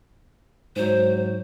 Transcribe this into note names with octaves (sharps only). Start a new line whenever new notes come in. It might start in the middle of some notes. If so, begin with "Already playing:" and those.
G#2 F#3 C5